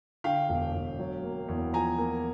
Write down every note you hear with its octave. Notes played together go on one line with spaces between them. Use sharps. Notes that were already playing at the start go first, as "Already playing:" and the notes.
D3 F5 G5
E1
E1
F#3
A#3
E2
F3 G#5 A#5
A#3